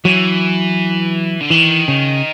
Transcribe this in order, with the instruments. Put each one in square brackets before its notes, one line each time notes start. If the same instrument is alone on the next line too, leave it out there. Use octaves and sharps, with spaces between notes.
[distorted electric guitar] E3 [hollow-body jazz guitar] F#3
[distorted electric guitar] D3
[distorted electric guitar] D#3 [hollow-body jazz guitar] E3
[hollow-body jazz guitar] C#3